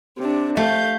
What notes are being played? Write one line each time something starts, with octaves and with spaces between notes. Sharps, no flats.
C3 D4
A3 F5 G6